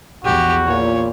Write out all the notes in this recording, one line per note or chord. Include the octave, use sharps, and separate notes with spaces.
A#1 E2 F#4 G4
A#2 C#5